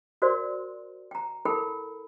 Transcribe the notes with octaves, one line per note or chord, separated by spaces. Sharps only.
F#4 A#4 C5 D5 C6
G5 A#5
E4 A4 A#4 G5 B5